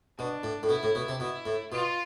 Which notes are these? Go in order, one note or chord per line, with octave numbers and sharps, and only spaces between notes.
B2 D4
A2
A2
B2 E4
A2
B2
C3
B2 E4
A2
B2 F4